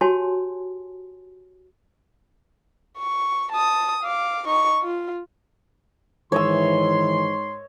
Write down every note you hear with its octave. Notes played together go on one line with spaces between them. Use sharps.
F#4 G4 C#5 G#5 A5 C6
C#6
A5 D#6
F5 D6
D#4 C#6
F4
G#2 D#3 E3 C#5 D#5 C6 E6